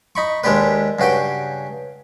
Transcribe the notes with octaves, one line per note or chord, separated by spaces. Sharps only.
D#4 B5 C#6
D#2 G#3 D4 G4 B4
G2 C#3 F#4 G4 G5